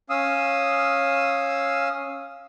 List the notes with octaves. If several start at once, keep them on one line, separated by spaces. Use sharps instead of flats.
C#4 F5 D#6 E6